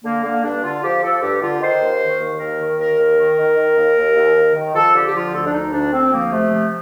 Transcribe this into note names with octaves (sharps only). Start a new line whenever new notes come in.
D3 A#3
D3 A#3
G2 D4
D3 F4
F3 G4
F3 A4
G2 G4
D3 F4
D#3 C5
D#2
D#3
D#2
D#2 A#4
D#3
D#2 A#4
D#2
D#3
D#3
D#3
D#2
D#2
D#2
D#2
D#3
F3 A4
D3 G4
G4
F3 F4
D2 A4
D4
D2 D#4
D2 D4
D2 C4
F3 A#3
C3 A3
F3